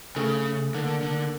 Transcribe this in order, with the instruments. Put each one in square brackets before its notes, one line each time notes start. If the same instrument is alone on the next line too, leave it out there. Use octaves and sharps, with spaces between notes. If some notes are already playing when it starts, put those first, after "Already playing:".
[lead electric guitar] C#3 [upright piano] A3
[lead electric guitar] D3 [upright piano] A#3
[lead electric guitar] D3